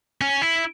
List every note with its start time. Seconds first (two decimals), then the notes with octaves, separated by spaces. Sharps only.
0.21 C#4
0.42 E4